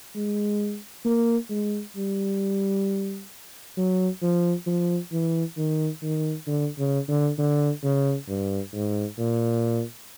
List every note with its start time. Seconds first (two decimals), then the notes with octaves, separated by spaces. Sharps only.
0.15 G#3
1.05 A#3
1.50 G#3
1.96 G3
3.77 F#3
4.22 F3
4.67 F3
5.12 E3
5.57 D#3
6.02 D#3
6.47 D3
6.78 C#3
7.08 D3
7.39 D3
7.84 C#3
8.28 G2
8.74 G#2
9.19 A#2